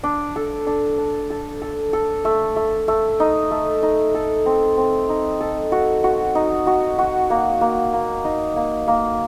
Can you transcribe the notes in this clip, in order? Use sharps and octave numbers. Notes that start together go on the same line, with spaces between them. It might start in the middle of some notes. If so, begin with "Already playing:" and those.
D4
A4
D4
D4
A4
A4
A4
A3
A3
A3
D#4
A3
D#4
A4
C4
C4
D#4
A4
F#4
F#4
D#4
F#4
F#4
A#3
A#3
A#3
D#4
A#3
A#3